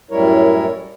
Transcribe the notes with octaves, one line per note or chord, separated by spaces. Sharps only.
F#2 A2 G3 E4 A#4 C#5